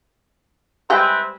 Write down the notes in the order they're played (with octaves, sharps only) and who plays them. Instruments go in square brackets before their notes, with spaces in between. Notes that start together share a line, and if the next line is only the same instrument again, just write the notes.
[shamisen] G3 G#3 G5 [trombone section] C4 E4 B4